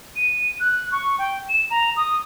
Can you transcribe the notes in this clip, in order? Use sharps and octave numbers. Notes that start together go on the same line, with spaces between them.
D#7
F#6
C#6
G5
E7
A#5
D#6